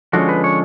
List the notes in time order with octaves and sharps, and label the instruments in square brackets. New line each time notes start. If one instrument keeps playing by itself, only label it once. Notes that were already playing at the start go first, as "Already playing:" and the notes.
[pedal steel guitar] D3 F3 G#3 C#4 F#4
B4
C#5